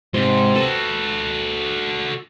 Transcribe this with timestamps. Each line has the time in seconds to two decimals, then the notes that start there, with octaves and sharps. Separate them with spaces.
0.14 G#2 C3 C6
0.56 F#4 A4 B4